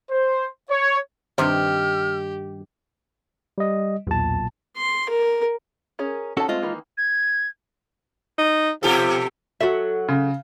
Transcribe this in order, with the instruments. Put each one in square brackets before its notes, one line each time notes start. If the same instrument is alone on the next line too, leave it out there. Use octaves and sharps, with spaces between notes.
[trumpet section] C5
C#5
[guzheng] G2 D#3 [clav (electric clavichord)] C3 [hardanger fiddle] G4 [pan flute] F6
[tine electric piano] G3 D#5
[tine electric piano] B1 A#2 A5 [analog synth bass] E2
[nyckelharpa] C6
A#4
[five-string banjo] C#4 G#4 A#4
[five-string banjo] D#3 A5 [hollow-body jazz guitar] C#4 F#4 A4
[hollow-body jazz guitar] G#3 F4 D#5 [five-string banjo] A3 C4
[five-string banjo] D#3 E3 A#3
[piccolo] G#6
[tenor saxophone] D#4
[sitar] B2 G4 A4 [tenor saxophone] F3
[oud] F#3 A4 [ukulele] F#4 E5
[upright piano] C#3